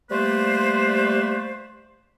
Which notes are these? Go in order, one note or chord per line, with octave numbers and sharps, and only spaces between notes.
G3 A3 A#3 B4 C5